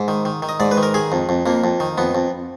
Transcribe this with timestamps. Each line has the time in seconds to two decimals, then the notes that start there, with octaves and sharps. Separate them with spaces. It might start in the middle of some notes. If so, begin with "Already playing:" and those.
Already playing: G#2
0.08 D#3
0.25 D#3
0.42 D#3
0.49 D#5
0.60 G#2 D5
0.71 B4
0.77 D#3
0.83 A#4
0.94 D#3 G#4
1.12 F2
1.29 F2
1.46 F2 A#3
1.64 F2
1.80 D#3
1.98 F2 B3
2.15 F2